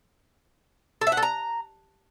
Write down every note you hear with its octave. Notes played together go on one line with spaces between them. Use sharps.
A4
E5
F#5
A4
A#5